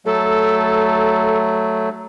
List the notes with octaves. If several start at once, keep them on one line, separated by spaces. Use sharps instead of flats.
F#3 A3 A4